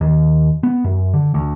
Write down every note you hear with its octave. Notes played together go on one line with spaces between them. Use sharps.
D#2
B3
F#2
D3
D2